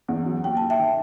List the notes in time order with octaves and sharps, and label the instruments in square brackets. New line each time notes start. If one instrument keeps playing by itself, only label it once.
[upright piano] E2
F#3
[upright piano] D#2 [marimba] G5
[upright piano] D#2 [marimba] A5
[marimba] E5 G5
[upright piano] D#3